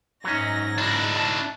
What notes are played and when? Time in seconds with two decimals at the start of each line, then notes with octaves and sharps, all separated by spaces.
0.25 G#2 F#3 C#4 D#4 A#6
0.78 D4 E4
1.16 A5